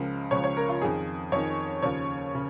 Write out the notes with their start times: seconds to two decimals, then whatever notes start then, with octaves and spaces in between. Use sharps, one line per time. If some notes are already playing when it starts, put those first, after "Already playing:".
Already playing: C#2 C#3 F3 A#4
0.31 C#2 C#3 F3 C#5
0.44 C#5
0.57 A#4
0.69 F4
0.81 F2 D#3 G#4
1.32 F2 D#3 C#5
1.82 D#2 C#3 F3 C#5
2.35 C#3